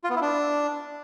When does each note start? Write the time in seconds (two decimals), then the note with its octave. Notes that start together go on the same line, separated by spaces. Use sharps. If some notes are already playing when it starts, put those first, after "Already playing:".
0.04 F4
0.10 B3
0.16 E4
0.22 D4